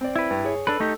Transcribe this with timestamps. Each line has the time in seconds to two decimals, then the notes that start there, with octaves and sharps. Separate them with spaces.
0.01 C4 D5
0.16 E4 B4
0.30 G2
0.44 G#4 C#5
0.67 D4 A4 B4
0.80 A3 D#4 G4